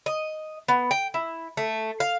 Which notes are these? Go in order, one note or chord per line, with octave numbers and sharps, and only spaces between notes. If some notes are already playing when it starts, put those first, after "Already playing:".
D#5
B3
G5
E4
A3
F5